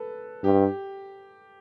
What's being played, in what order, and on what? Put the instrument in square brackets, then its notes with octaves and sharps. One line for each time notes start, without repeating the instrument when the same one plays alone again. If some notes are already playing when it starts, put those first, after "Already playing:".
Already playing: [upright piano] A4 B4
[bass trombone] G2 [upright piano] G4